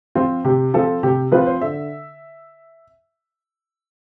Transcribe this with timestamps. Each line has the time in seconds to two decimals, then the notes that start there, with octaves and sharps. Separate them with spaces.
0.15 F3 C4 F4
0.44 C3 G4
0.74 F3 C4 F4 A4
1.03 C3 G4
1.32 F3 C4 F4 B4
1.46 C5
1.61 D3 E5